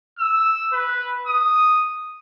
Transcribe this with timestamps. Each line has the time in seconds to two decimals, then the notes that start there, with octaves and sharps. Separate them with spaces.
0.19 E6
0.72 B4
1.27 D#6